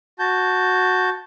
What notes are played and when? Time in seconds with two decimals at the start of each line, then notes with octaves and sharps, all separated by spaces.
0.19 F#4 A5 G6